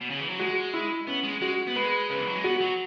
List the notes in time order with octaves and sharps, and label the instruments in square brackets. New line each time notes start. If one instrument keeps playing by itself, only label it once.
[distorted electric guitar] B2
C#3
E3
F#3
[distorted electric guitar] G#3 [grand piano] F#4
[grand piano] E4
[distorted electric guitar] B3 [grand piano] C#4
[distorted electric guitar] G#3
[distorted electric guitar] G#3 [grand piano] F#4
[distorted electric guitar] B3
[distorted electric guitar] G#3 [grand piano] B4
[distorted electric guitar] C#3 [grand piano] B4
[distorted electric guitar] E3
F#3
G#3
[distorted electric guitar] B3 [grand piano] F#4
[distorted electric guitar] F#3